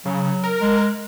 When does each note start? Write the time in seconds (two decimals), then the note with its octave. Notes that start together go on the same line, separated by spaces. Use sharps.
0.06 C#3 F#3
0.43 A#4
0.61 G#3